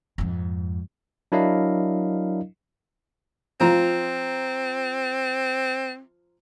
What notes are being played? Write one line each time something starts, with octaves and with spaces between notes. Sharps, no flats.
F2 G#2
F#3 D4 E4 A#4 D#5 F5
F3 C4 F4 A#5